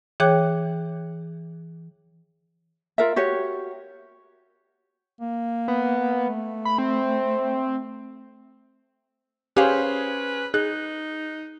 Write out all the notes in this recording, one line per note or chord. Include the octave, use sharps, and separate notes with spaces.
E3 G#4 C#5 G5 D6 F#6
F4 A#4 E5
F#4 G4 C#5
A#3
B3
A3
B5
C4
C#4 G4 G#4 B4 C5 F5
D#4 G#4 F#6